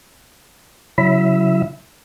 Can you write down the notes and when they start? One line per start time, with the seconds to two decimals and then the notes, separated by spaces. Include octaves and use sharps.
0.98 C#3 F#3 E4 E5